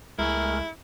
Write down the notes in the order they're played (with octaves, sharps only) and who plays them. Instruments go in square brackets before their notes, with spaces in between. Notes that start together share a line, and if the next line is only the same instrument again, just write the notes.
[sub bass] C#2 [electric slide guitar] G#3 A3 G#4 [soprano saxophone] E4 [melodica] A#4